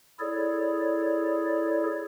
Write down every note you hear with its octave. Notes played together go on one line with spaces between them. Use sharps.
E4 G#4 A4 C#5 D5